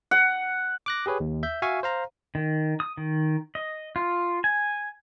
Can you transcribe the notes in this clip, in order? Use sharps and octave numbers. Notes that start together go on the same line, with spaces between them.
F#5
D6 F#6 A#6
G4 G#4 B4 C#5
D#2
E5 G6
F#4 E5 F5 G#5 C#6
C5 F5 A#5
D#3
D#6
D#3
D#5
F4
G#5